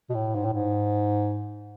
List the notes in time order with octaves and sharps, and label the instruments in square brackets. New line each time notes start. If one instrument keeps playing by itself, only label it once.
[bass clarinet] B2
A2
G#2
A2
G#2